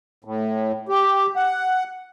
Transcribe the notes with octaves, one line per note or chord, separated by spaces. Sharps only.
A2
G4
F#5